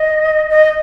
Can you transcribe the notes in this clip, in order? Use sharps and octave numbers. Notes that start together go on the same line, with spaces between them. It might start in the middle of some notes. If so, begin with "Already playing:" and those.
Already playing: D#5
D#5